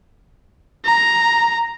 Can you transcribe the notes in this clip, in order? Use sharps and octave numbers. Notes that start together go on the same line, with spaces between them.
A#5